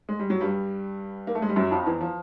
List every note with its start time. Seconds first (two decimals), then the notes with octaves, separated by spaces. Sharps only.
0.09 G#3
0.19 G3
0.30 F#3
0.41 G2 G3
1.27 A#3
1.35 A3
1.42 G#3
1.49 G3
1.56 F#2 F#3
1.71 F2 F3
1.86 E2 E3
2.01 F3